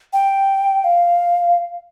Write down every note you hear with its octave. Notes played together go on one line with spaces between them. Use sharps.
G5
F5